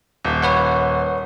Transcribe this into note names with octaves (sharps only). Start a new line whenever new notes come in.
D#1
B4 C#5 F#5